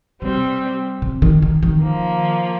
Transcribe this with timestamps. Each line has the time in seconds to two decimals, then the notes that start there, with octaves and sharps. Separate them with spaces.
0.22 C3 G3 C4
1.02 C3
1.22 D#3
1.42 D#3
1.63 D#3
1.83 F3 A#3